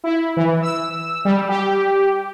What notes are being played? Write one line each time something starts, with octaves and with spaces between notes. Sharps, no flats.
E4
E3
E6
G3
G4